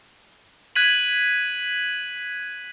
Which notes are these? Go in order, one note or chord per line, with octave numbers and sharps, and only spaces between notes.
F#6 G#6 B6 D#7 F#7